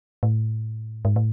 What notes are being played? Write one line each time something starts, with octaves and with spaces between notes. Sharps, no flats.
A2
G#2
A2